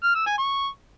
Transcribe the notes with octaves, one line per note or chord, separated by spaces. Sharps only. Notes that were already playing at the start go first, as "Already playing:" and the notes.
F6
E6
G#5
C#6